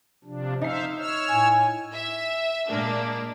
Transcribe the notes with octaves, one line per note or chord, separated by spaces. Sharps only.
C3 F3 D4
D#4 C5 E5 F5 C7
C#5 E6 F6
A2 G#5
E5
A#2 G#3 A#3 D4